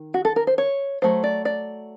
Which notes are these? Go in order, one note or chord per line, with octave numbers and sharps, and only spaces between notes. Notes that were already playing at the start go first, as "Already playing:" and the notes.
Already playing: D#3
F#4
A4
A#4
C5
C#5
F#3 A3 C5
D5
D5